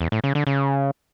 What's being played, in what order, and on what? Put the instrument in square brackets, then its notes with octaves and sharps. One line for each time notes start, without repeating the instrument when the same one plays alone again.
[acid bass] E2
A2
C#3
D3
C#3